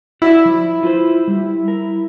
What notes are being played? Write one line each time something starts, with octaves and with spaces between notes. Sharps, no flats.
E4 F#4 D5 E5
F3
F4 B4 C5
G3
A#4